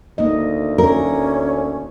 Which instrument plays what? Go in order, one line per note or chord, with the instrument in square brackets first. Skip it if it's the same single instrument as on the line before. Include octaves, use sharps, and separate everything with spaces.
[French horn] D2 [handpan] A#3 D#4 D#5
[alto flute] C#4 [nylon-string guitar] A#4